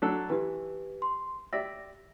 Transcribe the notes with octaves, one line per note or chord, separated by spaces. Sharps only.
F#3 D4 A4
E3 G4 B4
C6
G4 D5 E5 A#6